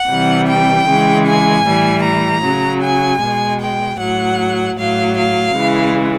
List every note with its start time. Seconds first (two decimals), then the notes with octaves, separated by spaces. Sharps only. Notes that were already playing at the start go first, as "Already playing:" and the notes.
Already playing: F#5
0.08 C3 E3 G3
0.47 G5
0.86 C#3 E3 G#3
1.26 G#5
1.64 A2 E3 G3
2.03 A#5
2.43 C#3 F#3
2.82 G#5
3.21 B2 G#3
3.60 G5
3.99 A2 F#3 F#5
4.78 A2 F#3 F5
5.17 F5
5.56 C#3 E3 G#3